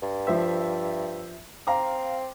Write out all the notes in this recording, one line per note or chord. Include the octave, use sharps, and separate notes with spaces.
G2
F3 C5 E5
C4 F5 A#5 D6